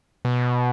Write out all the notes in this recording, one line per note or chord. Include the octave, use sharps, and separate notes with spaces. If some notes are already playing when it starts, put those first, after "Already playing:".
B2